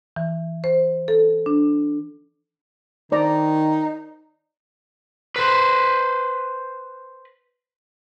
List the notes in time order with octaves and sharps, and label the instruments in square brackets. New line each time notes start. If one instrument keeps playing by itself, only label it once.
[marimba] E3
C5
A4
D4
[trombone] D#3 [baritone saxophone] D#4 [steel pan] C5 D5 A#5
[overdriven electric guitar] B4 C5